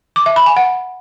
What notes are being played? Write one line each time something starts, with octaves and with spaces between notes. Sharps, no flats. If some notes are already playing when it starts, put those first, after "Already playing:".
D6
E5
B5
G#5
F#5